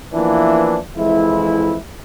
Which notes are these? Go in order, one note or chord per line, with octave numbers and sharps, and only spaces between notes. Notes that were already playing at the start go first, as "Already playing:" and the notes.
E3 F3 A#3 B3 D4 E4
F2 E3 G#3 E4